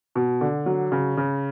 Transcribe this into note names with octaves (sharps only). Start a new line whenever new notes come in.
B2
D3
F#3
C#3
C#3